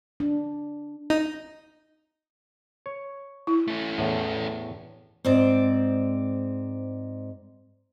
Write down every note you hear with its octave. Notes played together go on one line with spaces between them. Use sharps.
D4
D#4
C#5
E4
A3 C#4
E2 A2
G#2 C4 D5